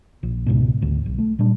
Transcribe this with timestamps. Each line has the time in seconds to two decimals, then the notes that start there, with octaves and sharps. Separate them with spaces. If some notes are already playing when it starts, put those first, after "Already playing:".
0.23 A#1
0.46 C#2 G#2 B2
0.81 G#1 D2
1.06 B1
1.18 A3
1.39 A#2 G3 D4